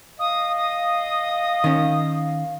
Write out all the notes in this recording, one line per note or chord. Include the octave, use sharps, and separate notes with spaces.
D#5 F5 D#6
D#6
D#3 C#4